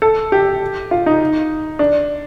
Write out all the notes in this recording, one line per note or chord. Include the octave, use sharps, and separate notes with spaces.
A4
G4
F4
D#4
D4